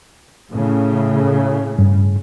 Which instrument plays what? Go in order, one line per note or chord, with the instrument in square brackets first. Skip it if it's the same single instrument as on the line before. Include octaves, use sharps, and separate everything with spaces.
[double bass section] A2 C#3
[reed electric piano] G2